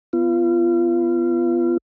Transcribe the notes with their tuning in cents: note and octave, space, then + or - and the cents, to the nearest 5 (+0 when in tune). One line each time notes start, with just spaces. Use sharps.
B3 +15 F4 -30